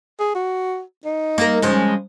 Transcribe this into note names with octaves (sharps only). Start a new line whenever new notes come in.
G#4
F#4
D#4
A#3 A#4
C#3 F3 G#3